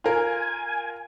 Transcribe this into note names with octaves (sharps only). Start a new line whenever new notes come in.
F4 A#4 G#5